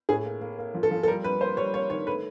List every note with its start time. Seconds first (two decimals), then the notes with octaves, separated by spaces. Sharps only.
0.09 A2 G#4
0.25 A#3
0.41 A#3
0.58 A#3
0.75 F3
0.83 A4
0.91 F3
1.03 A4
1.08 G3 A#4
1.24 G3 B4
1.41 A#3 C5
1.57 G3 C#5
1.74 A#3 C#5
1.90 D#3 C#5
2.07 A3 B4